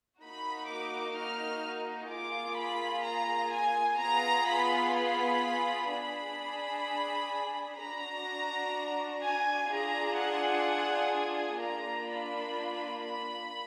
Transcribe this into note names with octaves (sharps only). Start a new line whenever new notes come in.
A#3 D#4 F#4 B5
D6
F6
A#3 F4 G#4 D6
B5
A#5
G#5
B3 F4 G#4 A#5
B5
B5
D4 G#4 B5
D4 F#4 A#5
G#5
D4 F4 G#4 A#5
F#5
G#5
A#3 D4 F4 A#5
B5
B5